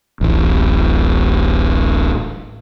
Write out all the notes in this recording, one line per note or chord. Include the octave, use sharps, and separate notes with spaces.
D1 A1